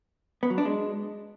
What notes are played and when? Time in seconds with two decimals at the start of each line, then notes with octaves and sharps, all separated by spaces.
0.43 B3
0.50 F#3
0.58 D4
0.65 G#3